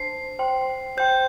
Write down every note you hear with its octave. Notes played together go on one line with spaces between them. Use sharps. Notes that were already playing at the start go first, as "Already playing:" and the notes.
Already playing: D4 C5 A5 C6 C7
C5 G5 C6
C5 G5 C6 G6